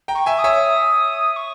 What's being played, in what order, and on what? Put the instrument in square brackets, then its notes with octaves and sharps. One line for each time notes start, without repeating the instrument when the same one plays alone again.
[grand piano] G5 A#5
[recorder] C#6
[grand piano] E5 G#5
[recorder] D#6
[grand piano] C#5 E5
[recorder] D#6
C#6